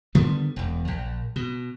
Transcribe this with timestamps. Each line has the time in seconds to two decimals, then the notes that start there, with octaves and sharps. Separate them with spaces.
0.15 D3 D#3 G3 B3
0.56 E1 E2
0.88 A#1
1.36 B2